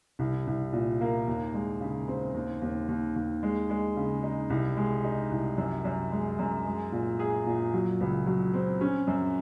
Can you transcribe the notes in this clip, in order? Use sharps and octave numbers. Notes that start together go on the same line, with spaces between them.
C2
C2
A#2
A#3
D#2
G#3
C#3
C4
D#2
D#2
D#2
D#2
G#3
G#3
C#3
D#4
C2
G#3
D#4
C2
F#2
F#2
G#3
F#2
G#3
A#2
G#4
A#2
F#3
C#2
F#3
C4
C#4
F#2